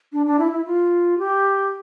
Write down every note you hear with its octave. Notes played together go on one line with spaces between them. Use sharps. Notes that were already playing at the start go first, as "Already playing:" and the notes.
D4
D4
E4
E4
F4
G4